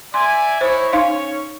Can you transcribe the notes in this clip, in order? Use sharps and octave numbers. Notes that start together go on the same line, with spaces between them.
D5 E5 G#5 C6
D#4 E4 C5 C#5
C#4 D#4 C#5 F5 C6